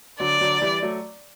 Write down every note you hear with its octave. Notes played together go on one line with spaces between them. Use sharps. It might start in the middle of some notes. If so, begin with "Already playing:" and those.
D3 F#3 D5
D3 F#3
E3 G3
F#3 A3